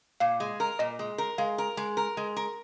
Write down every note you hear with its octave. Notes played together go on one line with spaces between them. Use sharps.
A#2 F5
G#3
A#4
A#2 D#5
G#3
A#4
G#3 F5
A#4
G#3
A#4
G#3
A#4